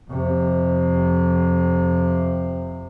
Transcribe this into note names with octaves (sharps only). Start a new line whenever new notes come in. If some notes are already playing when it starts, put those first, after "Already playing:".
F2 C3